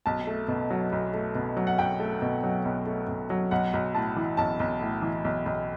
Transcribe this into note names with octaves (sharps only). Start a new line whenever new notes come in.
B1 A5
A3
B2
F#3
B1
A3
B2
F#3
F#5
B1 G5
A3
B2
F#3
B1
A3
B2
F#3
B1 F#5
B1
A2 A5
E3
B1 A5
B1
A2
E3
B1
B1